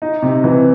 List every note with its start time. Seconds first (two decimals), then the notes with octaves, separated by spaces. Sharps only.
0.02 D#4
0.22 C3
0.44 E3